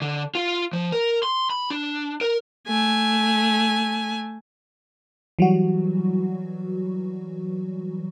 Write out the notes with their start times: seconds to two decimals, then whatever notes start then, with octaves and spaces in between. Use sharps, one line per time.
0.02 D3
0.35 F4
0.73 F3
0.92 A#4
1.23 C6
1.50 B5
1.70 D4
2.21 A#4
2.68 A3 G#5
5.39 E3 F#3 G3 F#4